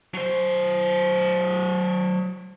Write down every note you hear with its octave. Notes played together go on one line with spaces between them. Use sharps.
F#3 C5